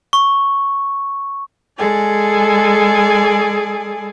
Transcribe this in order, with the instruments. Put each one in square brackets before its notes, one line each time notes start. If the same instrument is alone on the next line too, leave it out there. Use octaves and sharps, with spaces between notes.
[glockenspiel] C#6
[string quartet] G#3 G#4 A4 D5 G#5